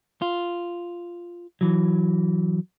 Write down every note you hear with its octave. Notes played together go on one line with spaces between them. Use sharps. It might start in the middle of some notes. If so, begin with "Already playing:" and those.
F4
E3 F#3